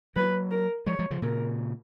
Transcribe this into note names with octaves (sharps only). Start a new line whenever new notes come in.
F#3 A#3 B4
A#4
F3 G#3 C#5
F3 G#3
C#3 F3
A#2 C#3 A#4